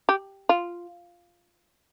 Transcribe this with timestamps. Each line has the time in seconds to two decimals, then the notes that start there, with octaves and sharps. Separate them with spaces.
0.09 G4
0.49 F4